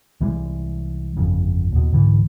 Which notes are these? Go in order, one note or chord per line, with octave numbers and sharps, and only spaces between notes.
C2 E3 G3 G#3
G1 F2 C#3
D#2 B2
C2 G#2 D3 E3